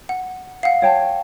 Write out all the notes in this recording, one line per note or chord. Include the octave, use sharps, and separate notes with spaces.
F#5
F5 F#5
C#5 G5 A5